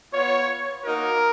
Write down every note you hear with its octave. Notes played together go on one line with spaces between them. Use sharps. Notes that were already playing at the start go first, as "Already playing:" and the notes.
B3 F4 C#5
A#3 D#4 F#4 A#4